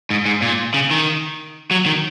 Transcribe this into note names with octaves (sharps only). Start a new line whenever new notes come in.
G#2
G#2
A#2
C#3
D#3
F#3
D#3